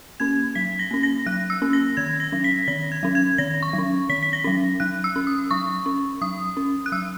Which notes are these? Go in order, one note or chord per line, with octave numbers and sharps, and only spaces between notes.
A#3 C#4 G#6
F#3 B6
A#6
A#3 C#4
A#6
F#3 F#6
E6
A#3 C#4
A#6
D#3 G#6
A#6
F#3 C#4
B6
D#3 A#6
G#6
F#3 C#4
G#6
D#3 A#6
C#6
F#3
C#4
D#3 B6
B6
A#6
F#3 C#4
F#3 F#6
E6
C#4
D#6
F#3 C#6
C#4
F#3 D#6
C#4
F#6
F#3 E6